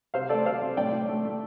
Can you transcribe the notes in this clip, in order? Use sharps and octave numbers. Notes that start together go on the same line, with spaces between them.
C3 C5 F5
A3 A4 D5
C3 C5 F5
C3
A2 D5 G5
A2
A3
A3